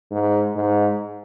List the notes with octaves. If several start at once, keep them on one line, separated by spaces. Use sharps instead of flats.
G#2
G#2